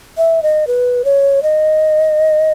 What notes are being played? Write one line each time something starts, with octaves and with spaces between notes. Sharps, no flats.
E5
D#5
B4
C#5
D#5